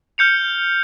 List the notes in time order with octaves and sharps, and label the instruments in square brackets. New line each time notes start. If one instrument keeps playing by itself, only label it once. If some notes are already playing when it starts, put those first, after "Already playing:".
[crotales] F6 G6 C#7 F7